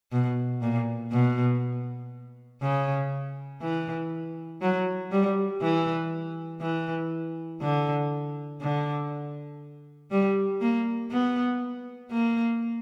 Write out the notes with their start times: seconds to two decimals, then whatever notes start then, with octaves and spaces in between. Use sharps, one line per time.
0.12 B2
0.62 A#2
1.12 B2
2.62 C#3
3.62 E3
4.62 F#3
5.11 G3
5.61 E3
6.61 E3
7.61 D3
8.61 D3
10.11 G3
10.61 A#3
11.11 B3
12.11 A#3